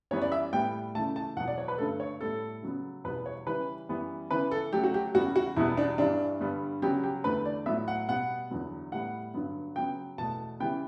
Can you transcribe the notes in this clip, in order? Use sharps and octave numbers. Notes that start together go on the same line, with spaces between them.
F#2 E3 G3 B3 C#5
D5
E5
A2 G3 B3 G5
C#3 E3 A3 A5
A5
E2 B2 F#3 F#5
D5
C#5
B4
G2 D3 A3 A4
C#5
A2 G3 B3 A4
C#3 F#3 B3
E2 B2 G3 B3 B4
C#5
C#3 E3 G3 B4
F#2 E3 G3 B3
C#3 E3 B3 B4
A4
C#3 F#3 A3 G4
F#4
G4
E2 C#3 G3 B3 F#4
F#4
E2 B2 G3 B3 E4
D4
G2 E3 G3 D4
G2 D3 G3 B3
C#3 F#3 B3 G4
G4
E2 D3 A3 B4
D5
A2 F#3 B3 E5
F#5
B2 G3 B3 F#5
E2 D3 F#3 B3
A2 G3 B3 F#5
G2 D3 F#3 B3
C#3 F#3 B3 G5
E2 B2 A3 A5
C#3 E3 G3 B3 G5